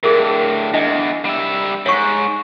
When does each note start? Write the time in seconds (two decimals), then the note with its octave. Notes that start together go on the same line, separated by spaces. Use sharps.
0.03 A2 D3 G#4 A#4
0.74 E2 D4 D#5 A5
1.25 G3 E5
1.86 G#2 C#5 C#6